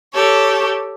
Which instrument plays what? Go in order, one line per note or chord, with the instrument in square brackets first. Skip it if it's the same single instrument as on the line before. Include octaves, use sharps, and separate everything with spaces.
[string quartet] G4 A4 C#5